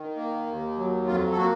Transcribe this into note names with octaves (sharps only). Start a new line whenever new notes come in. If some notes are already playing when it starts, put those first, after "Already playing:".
Already playing: D#3
A#3
D#2
F#3
F2 F4
A4
A#3 F#4